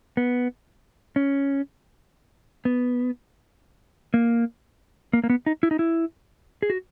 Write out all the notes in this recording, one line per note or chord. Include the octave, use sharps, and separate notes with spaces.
B3
C#4
B3
A#3
A#3
A#3
B3
D#4
E4
D#4
E4
G#4
F#4